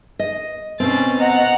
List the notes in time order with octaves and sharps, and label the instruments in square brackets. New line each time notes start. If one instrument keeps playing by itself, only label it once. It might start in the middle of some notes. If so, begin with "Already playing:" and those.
[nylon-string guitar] D#5
[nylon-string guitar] B2 C4 [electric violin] C#4 A6
[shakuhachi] D#5 [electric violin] F#5 A#5